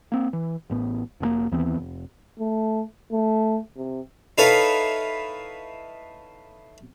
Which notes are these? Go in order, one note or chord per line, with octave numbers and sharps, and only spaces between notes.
A#3 C4
E3
A1 A2 B3
F1 A#2 A#3
D#2 E3 B3 C4
F1
A3
A3
C3
D#4 E4 A4 B4 C#5 F5